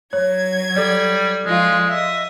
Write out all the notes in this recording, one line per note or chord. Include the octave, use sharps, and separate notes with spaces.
F#3 C#5 G#6
G3 A4 D5
F3 G#3 F4
D#5 E5